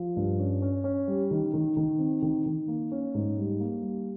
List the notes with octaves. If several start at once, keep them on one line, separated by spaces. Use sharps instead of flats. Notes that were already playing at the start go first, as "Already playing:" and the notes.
Already playing: F3
G2
C#4
C#4
C#4
G3
D#3
D#3
D#3
C4
D#3
D#3
A#3
C#4
G#2
G3
A#3
G3